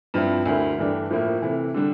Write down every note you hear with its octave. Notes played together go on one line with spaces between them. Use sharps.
G2 F3 C4 E4
D2 D3 A3 E4 A#4
G2 E3 A3 D4 G4
A2 F3 A#3 E4 A#4
C3 E3 A3 E4
D3 G3 D4